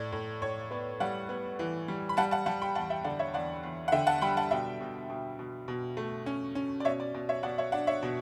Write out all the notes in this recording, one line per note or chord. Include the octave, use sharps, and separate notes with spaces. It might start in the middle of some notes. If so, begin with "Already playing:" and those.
Already playing: A2 D5
A2
A2 C#5
B3 D5
G3 D5 F#5
B3
E3
G3
B5
G3 F#5 A5
F#5 A5
G3 F#5 A5
G5 B5
E2 F#5 A5
E5 G5
D3 D5 F#5
C#5 E5
E2 D5 F#5
E2
F#5
D3 E5 G5
F#5 A5
G3 G5 B5
F#5 A5
B2 E5 G5
B2
B2
B2
B2
A3
C#4
C#4
D5
B2 C#5 E5
D5
B2 D5
C#5 E5
B2 D5 F#5
C#5 E5
D4 D5 F#5
C#5 E5
B2